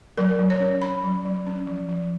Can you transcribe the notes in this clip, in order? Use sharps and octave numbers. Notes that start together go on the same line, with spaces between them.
F#3 A#4
F#3
C#5
C#4
C#4 B5
F#3
F#3
C#4
F3
F3